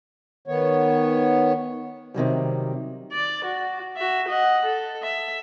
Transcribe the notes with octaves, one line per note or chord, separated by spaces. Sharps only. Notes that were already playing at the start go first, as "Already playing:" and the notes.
D#3 B3 C#5
C3 D#3 F#3 G3
D5
F#4
F#4 E5
D#5 F#5
A4
E5